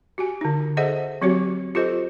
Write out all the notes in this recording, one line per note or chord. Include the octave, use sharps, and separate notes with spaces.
F#4 G4 G#5
D3 D#4
G#4 A4 C5 D#5 E5 F#5
F#3 C4 F#4 G4 C#5
F4 G4 A4 C5 D#5